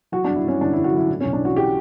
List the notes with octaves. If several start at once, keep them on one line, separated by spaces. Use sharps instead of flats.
F#3 F#4
G2 D4
E4
G2 C#4
G1 D4
G1 E4
F#4
F#3 E4
A2
B1 C#4
D4
E3 F#4
G4